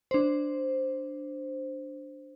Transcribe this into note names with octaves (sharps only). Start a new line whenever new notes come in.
D4 C5